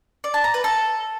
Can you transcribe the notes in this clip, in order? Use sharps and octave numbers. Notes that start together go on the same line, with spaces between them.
D5
A5
A#5
B4
A4